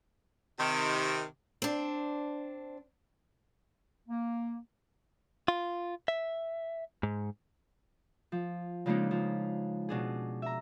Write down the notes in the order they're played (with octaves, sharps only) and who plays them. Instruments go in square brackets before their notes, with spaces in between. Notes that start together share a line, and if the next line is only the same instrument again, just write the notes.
[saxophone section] C3 D#3
[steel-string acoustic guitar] C4 D4
[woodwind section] A#3
[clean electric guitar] F4
E5
G#2
[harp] F3
C#3 F3 G#3 A#3 D4 D#4
F3
B2 D4 G#4
E5 A#5